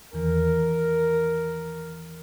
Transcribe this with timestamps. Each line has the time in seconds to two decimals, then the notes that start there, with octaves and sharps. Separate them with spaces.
0.13 E2 D#3 E3 A#4